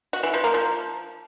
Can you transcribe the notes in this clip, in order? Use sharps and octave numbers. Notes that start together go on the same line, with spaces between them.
F#4
E3
F3
A#3
F3